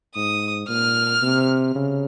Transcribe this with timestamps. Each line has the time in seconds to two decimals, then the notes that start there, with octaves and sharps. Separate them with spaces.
0.15 G#2 D#6
0.69 A#2 F6
1.22 C3
1.75 C#3